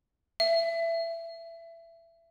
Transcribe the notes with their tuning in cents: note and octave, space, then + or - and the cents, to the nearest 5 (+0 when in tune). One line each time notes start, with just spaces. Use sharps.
E5 +20